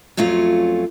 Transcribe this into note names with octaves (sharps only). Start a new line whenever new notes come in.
F2 F#3 A3 C#4 F4